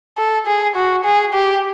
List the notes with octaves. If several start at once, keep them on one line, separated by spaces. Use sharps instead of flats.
A4
G#4
F#4
G#4
G4